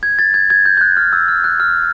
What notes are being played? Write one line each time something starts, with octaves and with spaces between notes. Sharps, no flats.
G#6
A6
G#6
G#6
G6
G6
F#6
F6
E6
F6
F#6
F6